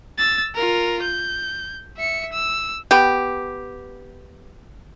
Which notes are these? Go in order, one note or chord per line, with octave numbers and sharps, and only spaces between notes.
E6 A6
F4 A#4
G6
E5 C#7
E6
B3 G4